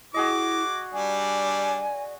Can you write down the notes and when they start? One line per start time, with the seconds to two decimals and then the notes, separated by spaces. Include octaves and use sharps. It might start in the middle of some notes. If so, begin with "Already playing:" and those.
0.14 E4 F#4 G#4 D#5 D6
0.93 G3 D4 D5 G#5